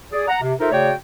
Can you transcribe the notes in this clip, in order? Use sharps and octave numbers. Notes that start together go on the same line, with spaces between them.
G#4 D5
F#5 A#5
C3
D#4 F4 A4 A#4 C5 E5
C#3 A3 F#4 C#5 D5 G5